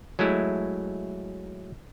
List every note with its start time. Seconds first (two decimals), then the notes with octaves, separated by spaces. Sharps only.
0.19 F#3 G#3 A3 E4